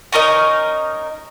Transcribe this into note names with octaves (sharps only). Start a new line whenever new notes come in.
C#4 D#4 A#4 D#5